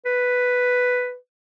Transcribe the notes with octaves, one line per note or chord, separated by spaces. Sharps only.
B4